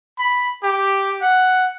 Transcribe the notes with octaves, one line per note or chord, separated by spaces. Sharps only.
B5
G4
F#5